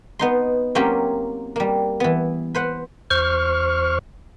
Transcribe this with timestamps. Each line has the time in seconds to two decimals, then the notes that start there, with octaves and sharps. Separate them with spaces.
0.19 B3 D#4 C6
0.75 F#3 A#3 C4 C#4 F4 G4
1.56 G3 A#3
2.00 E3 B3
2.55 B4 C5 F#5
3.11 E2 C5 C#6 F6